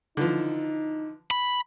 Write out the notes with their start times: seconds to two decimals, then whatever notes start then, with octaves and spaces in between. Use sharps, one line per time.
0.17 D3 E3 F3 D#4
1.31 B5